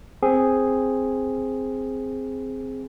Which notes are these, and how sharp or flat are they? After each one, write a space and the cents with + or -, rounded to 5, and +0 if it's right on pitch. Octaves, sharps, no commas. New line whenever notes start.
C4 +0 G#4 +0